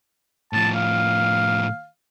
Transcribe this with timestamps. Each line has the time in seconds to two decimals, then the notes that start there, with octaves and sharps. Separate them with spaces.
0.53 A2 F3 A5
0.74 F5